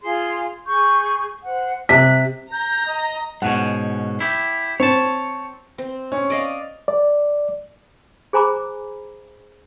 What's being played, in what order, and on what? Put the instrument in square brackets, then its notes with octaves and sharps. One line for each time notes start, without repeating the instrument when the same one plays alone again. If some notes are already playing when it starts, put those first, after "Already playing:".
[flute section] F4 G#4 C6
G#4 C#6 G6
C5 F#5
[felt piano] C3 B6 [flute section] F#6
[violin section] A#5 [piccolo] G6
[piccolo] D#5
[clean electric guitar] G#2 B2 C#4 [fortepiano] F#5
[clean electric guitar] E4 G4
[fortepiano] C4 [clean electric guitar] C#5 A5
[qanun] C4
[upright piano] C#4
[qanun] D5 D#5 F5
[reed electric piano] D5
[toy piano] G#4 C5 G#5 A#5 B5 D6